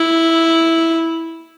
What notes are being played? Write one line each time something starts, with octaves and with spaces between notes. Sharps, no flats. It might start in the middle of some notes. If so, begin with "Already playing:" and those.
Already playing: E4